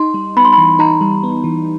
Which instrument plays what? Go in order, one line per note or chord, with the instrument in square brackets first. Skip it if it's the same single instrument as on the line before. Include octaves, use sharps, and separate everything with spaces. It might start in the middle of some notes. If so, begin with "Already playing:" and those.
Already playing: [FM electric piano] D#4 [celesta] C6
[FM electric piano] G3
[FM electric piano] B3 [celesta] B5
[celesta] C6
B5
[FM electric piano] E3
[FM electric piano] D#4 [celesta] A#5
[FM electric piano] G3
B3
E3